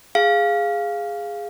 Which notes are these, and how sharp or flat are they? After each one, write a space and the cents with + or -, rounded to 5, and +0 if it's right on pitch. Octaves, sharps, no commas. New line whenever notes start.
G#4 -5 F5 +0